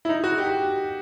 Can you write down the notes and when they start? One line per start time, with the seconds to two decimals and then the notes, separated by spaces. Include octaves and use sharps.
0.05 E4
0.09 D#4
0.24 F#4
0.38 G4